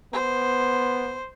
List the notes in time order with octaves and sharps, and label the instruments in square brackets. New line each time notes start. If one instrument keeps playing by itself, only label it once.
[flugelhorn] B3 [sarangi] C5